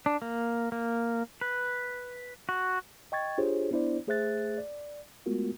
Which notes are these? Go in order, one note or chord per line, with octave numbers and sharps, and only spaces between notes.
D4
A#3
A#3
B4
F#4
D#5 G5 C#6 G#6 A6
D4 F4 G4 G#4 C5 C#5
B3 D4 E4 C5 D5
A3 G#4 C5 E5 F#6 A6
D5
G#3 A3 B3 F4 F#4 A#4